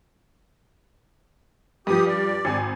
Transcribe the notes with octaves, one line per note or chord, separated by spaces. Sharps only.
G2 F3 G4 D#6
D5
G#1 G#5